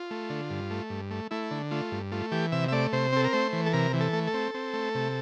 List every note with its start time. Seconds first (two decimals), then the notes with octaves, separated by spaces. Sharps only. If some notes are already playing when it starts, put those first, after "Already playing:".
Already playing: F4
0.11 A3
0.30 D3
0.50 G2
0.70 A3
0.90 G2
1.11 A3
1.31 A3 E4
1.51 D3
1.71 A3 F4
1.92 G2
2.12 A3 F4
2.32 E3 G4
2.52 C3 E5
2.68 E5
2.72 A3 D5
2.93 C3 C5
3.13 C4 A4
3.24 A#4
3.33 A3 C5
3.53 E3
3.66 A4
3.73 C3 A#4
3.93 E3
4.01 A4
4.13 A3
4.27 A4
4.34 C4
4.54 C4
4.73 A3
4.95 C3